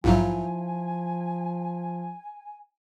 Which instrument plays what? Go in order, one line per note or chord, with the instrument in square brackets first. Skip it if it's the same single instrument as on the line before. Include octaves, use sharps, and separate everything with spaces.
[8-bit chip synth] A#1 G#2 F#3 [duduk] F3 [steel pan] E4 F4 [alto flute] G#5